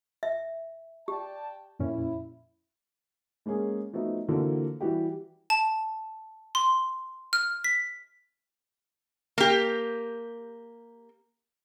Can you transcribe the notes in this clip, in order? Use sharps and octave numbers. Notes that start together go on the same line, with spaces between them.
E5
G4 D5 G5 A5
F2 A#2 C#4 E4
G#3 A#3 C#4 G#4
F3 A3 B3 D#4 F#4
D3 E3 F3 A#3 F#4 A4
E3 G3 F#4 G4
A5
C6
F6
B6
A#3 G4